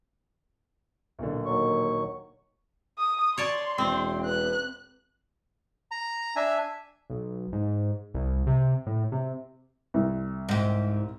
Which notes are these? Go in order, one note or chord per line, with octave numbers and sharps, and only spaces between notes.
B1 A#2 D3
D#2 F#3 C#6
D#6
C#5 D5 A5 C6
E1 C4 G5
B4 F#6
A#5
D4 E5 G#5
B1
G#2
C2
C3
A2
C3
C2
G#2 G4